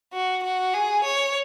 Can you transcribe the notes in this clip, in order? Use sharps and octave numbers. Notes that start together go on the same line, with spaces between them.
F#4
F#4
G#4
C#5